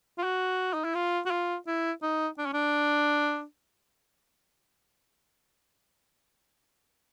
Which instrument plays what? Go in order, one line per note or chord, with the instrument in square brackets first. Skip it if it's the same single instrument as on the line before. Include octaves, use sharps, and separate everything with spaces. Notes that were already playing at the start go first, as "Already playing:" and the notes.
[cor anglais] F4
F#4
D#4
E4
F4
F#4
F4
E4
D#4
D4
C#4
D4